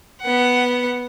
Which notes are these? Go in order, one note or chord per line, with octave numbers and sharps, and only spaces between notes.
B3 F#5